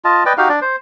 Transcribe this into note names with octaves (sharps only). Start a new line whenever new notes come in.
F4 D#5 A5
B4 D5 D#5 G5
D#4 F#4 G4 F5
D4 D5
C5